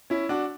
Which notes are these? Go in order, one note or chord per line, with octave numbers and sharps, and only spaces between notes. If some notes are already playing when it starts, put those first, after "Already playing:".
C#4 E4
D4 F#4